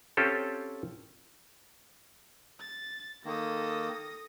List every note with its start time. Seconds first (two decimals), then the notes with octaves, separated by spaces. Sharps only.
0.17 C4 C#4 F4 G4 A4
2.60 A6
3.25 D#3 A#3 A4 D#6 A#6